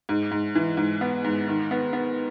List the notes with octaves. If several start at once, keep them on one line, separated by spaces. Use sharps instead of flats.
G#2
G#2
E3
G#2
B3
G#2
D#3
B3
B3